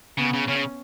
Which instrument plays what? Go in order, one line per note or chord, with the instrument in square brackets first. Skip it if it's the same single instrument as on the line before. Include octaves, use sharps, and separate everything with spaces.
[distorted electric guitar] C#3 [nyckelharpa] B3
[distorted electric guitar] C#3
[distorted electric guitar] C#3 [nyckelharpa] C#4